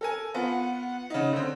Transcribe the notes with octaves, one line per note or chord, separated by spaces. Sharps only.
A4 A#4 G#5
B3 F4 F#5
C#3 D#4
D3 C4